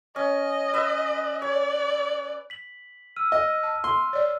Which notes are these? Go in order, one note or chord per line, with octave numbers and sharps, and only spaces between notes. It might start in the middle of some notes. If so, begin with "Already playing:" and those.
C#4 D#5
B4 E5
C#5 D5
B6 F#7
E6 F6 D#7
D#5
A5
C6
C#5 D5